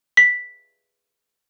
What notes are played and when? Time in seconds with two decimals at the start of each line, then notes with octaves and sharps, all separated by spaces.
0.17 B6